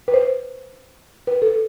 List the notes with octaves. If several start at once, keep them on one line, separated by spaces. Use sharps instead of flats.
B4
C5
B4
A4